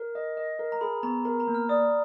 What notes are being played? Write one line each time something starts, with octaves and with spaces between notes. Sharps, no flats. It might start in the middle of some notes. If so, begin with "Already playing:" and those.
Already playing: A#4
D#5
D#5
A#4
A#5
G#4 B5
B3 A#5
A#4 A#5
A#5
A#3
F6
D5 D#6